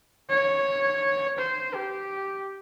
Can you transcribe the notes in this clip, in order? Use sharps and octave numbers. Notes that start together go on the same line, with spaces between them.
C#5
C5
G4